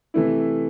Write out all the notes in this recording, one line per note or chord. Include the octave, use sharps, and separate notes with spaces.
C3 E3 A3 E4